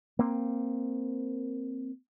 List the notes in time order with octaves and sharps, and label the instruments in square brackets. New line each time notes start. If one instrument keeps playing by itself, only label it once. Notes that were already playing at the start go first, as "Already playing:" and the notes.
[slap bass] A#3 C4